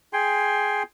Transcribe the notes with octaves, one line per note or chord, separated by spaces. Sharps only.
G#4 G5 G#5 C6